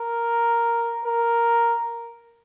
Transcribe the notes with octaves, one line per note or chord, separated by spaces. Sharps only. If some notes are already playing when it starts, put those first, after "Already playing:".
Already playing: A#4
A#4